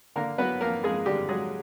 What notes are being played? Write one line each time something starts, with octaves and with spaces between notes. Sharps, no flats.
D3 A#3 A#4
F#3 B3 B4
F2 A#3 A#4
F2 G#3 G#4
D3 G3 G4
F#3 G#3 G#4